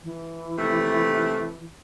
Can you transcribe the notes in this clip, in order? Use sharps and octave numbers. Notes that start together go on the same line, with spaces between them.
E3
D#2 C3 A3